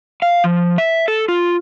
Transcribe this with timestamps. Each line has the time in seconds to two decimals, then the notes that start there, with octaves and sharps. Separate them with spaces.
0.22 F5
0.44 F3
0.78 E5
1.08 A4
1.28 F4